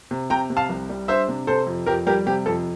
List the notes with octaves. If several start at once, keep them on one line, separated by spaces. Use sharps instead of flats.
C3
C3 G5 A#5
C3
F5 A5
C2
G3
D4 C5 E5
C3
C3 A4 C5
F2
F2 G4 A#4
G3 G4 A#4
C3 G4
F2 A4